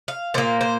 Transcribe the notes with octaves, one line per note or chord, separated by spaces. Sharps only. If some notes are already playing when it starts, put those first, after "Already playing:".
F5
A#2 A#3 C5
C5